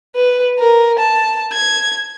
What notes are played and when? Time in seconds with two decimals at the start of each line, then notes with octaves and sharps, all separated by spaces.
0.16 B4
0.59 A#4
0.99 A5
1.52 G#6